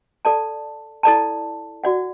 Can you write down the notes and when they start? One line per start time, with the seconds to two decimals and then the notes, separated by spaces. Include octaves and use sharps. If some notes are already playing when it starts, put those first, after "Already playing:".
0.25 A4 D5 A5
1.03 E4 A4 D5 A5
1.84 F#4 D5 F#5